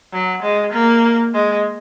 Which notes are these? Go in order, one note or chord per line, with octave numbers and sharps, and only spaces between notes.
F#3
G#3
A#3
G#3